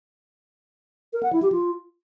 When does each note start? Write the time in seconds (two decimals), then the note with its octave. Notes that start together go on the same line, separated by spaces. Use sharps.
1.13 A#4
1.23 F#5
1.33 E4
1.42 G4
1.52 F4